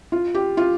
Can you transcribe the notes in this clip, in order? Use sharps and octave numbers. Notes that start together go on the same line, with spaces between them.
F4
G4
F4